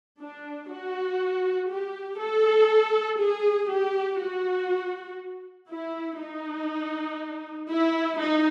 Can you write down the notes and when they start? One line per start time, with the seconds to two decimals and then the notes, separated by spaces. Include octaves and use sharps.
0.21 D4
0.71 F#4
1.71 G4
2.21 A4
3.21 G#4
3.70 G4
4.21 F#4
5.70 E4
6.20 D#4
7.70 E4
8.20 D#4